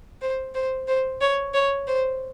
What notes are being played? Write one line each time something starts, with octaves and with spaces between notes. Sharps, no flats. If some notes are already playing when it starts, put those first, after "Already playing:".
C5
C5
C5
C#5
C#5
C5